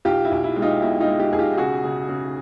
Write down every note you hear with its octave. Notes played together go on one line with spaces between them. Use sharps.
B1 F4 G4
E4
B1
E4
G#3
D#4 F4
B2 E4
D#4 F4
G#3
F4 G4
B1 G#4
F4 G4
C#3 F#4 G#4
C#3
C#3